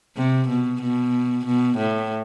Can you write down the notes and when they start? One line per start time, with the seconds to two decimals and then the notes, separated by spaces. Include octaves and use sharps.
0.17 C3
0.49 B2
0.82 B2
1.46 B2
1.78 A2